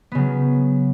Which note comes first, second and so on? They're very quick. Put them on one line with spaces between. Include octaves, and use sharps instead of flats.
B3 C#3 F#3